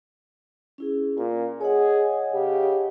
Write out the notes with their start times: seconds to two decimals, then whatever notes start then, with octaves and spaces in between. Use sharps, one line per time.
0.78 C#4 E4 G#4
1.18 A#2 F4
1.61 G#4 C#5 D#5 F#5
2.33 C#3 G4